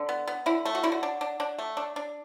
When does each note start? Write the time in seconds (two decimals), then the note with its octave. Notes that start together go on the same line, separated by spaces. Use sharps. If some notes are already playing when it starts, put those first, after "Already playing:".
Already playing: D3 D4
0.09 B3
0.28 B3
0.46 D3 E4
0.65 A3
0.75 F#4
0.83 D3 E4
0.92 F#4
1.03 D4
1.21 D4
1.40 D4
1.58 A3
1.77 D4
1.96 D4